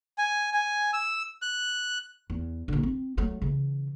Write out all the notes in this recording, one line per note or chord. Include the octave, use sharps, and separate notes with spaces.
G#5
G#5
E6
F#6
E2
A#1 D3
C4
F#3 A3
C#3 E3